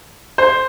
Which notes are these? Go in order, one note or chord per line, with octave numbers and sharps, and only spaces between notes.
C5